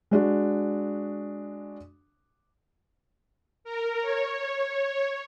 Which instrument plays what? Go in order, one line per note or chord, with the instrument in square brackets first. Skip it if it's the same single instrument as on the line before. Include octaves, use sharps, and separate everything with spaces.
[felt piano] G#3 D4 F#4
[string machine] A#4
C#5